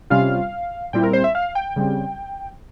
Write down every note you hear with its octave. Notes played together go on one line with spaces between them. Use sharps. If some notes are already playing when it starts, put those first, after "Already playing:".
C3 G3 C#4 F4 F5
A#2 G3 C4 E4 G5
A#4
C5
E5
F5
G5
C#3 G3 C4